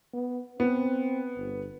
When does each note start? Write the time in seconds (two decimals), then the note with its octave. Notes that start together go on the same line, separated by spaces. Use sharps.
0.14 B3
0.60 B3 C4
1.37 G1